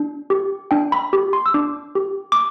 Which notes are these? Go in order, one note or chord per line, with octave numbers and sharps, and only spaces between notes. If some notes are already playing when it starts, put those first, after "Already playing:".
Already playing: D4
G4
D4 G5
B5
G4
C6
E6
D4 D6
G4
D6